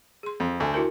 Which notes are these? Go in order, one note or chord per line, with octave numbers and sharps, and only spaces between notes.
G#4 C6
F2
D2 G#5
E4 F#4 A#4